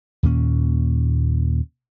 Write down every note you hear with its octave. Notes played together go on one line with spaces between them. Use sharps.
D#2 A#2 C#4